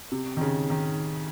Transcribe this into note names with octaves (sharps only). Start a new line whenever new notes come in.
C3
D#3
C#3
D#3